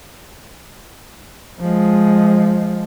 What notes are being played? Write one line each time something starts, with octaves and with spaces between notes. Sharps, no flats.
F3 G#3